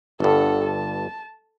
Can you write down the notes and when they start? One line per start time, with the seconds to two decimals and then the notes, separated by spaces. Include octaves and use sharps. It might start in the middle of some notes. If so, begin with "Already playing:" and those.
0.20 G1 G2 A4 F#5
0.64 A5